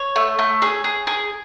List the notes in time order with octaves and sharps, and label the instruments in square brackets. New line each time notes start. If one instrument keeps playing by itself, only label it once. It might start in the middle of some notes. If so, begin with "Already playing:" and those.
Already playing: [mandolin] C#5
A3
A3
G#4
G#4
G#4